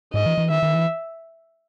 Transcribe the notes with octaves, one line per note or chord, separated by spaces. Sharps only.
G#2 D#5
E3
E3
D#3 E5
D#3
E3